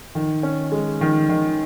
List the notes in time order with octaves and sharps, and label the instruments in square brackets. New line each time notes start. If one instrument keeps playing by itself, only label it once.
[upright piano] D#3
C#4
G#3
D#3
D#3